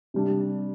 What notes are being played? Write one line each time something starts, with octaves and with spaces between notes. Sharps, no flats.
C3 G3 D4